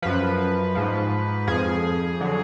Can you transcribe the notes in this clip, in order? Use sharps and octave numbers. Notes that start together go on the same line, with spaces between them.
F#2 F3 B4
G#2 F3
F2 F3 G#4
D3 F#3